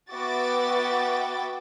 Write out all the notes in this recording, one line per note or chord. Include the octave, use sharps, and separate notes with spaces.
B3 F#4 E5 G5 D6 A6